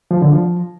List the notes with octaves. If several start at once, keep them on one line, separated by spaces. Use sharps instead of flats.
F3
D3
F3